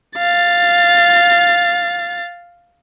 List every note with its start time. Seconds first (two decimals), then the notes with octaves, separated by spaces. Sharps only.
0.18 F5 A6